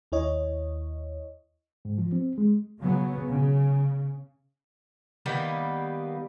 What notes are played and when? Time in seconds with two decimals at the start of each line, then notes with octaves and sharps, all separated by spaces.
0.12 D#2 E4 C#5 D#5
1.85 G#2
1.98 F3
2.12 C4
2.38 G#3
2.79 C#3 F#3 B3
3.28 C#3
5.26 D#3 G3 A#3 B3